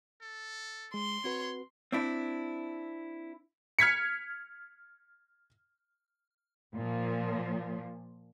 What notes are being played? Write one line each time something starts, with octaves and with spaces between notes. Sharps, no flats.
A4
G#3 C6
C4 F#4 B4 C#5
C4 D4 E4
F6 G#6 B6 C#7
A#2 F3